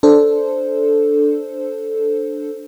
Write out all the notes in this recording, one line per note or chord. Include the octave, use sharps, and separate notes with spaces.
D4 A4 C5